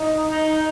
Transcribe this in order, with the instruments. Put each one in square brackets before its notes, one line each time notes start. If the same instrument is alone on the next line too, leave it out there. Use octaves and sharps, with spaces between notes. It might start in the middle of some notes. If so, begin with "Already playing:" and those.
Already playing: [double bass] D#4
[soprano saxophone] D#4